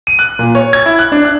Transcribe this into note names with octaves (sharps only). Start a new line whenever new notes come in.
D#7
F#6
A#2
C#5
G#6
E4
F#6
D4
F#6